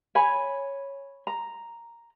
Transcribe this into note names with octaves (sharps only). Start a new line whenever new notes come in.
C#5 G#5 B5
A#5